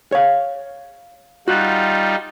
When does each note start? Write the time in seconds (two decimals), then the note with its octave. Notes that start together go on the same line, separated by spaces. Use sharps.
0.12 C#5 F5
1.48 G3 D#4 F4 F#4